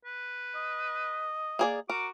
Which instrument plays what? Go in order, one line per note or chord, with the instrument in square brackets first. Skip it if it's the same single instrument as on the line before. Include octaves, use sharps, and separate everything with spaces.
[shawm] B4
[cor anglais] D#5
[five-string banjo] A#3 G#4 D5
[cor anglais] F#4 [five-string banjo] A#4 [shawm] D6